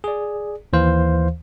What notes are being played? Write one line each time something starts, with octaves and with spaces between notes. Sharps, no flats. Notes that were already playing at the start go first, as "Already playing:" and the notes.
G#4 D5
D#2 E3 C5 F5